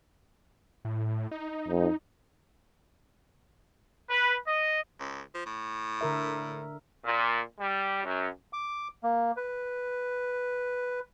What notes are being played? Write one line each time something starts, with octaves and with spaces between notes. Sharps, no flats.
A2
D#4
F2
B4
D#5
C#2
F3
A2
D3 A#4 E5
A#2
G3
F#2
D6
A#3
B4